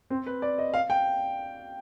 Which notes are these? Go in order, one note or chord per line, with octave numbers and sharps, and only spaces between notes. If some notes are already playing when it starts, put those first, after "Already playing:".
C4
B4
D5
D#5
F5
G5